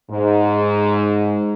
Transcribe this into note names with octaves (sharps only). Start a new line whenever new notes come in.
G#2